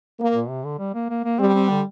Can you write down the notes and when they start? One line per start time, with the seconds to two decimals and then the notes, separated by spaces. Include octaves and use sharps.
0.19 A#3
0.34 A#2
0.49 C3
0.64 D3
0.79 G3
0.95 A#3
1.10 A#3
1.25 A#3
1.40 G3 C4
1.54 C4
1.70 D3